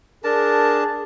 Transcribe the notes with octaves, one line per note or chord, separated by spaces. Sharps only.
D4 G#4 A#4 A5